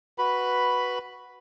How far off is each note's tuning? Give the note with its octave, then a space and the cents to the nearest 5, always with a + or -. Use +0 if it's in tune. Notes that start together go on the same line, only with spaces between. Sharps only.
F#4 +0 B4 +0 B5 +0